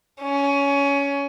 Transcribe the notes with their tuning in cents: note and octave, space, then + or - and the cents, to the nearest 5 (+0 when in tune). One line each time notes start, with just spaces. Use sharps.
C#4 +20